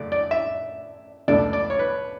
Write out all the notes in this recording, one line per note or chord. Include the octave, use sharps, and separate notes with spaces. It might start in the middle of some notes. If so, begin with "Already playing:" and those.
Already playing: F#2 C#3 A3 D5
D5
E5
C#2 B2 A3 D4 D5
D5
C#5
B4